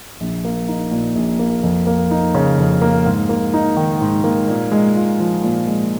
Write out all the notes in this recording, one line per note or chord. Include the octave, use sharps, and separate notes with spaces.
A#1
A#3
D#4
A#2
A#1
A#3
F2
A#3
D#4
C#3
F2
A#3
G#2
A#3
D#4
D#3
G#2
A#3
A#2
G#3
F4
F3
A#2
G#3